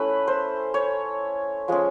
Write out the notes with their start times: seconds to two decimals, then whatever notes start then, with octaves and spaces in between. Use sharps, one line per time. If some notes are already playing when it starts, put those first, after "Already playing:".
Already playing: A3 C#4 E4 B4
0.27 C5
0.74 C#5
1.68 F3 G#3 C#4